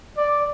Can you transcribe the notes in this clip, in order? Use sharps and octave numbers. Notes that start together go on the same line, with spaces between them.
D5